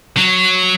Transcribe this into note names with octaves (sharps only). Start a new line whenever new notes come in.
F#3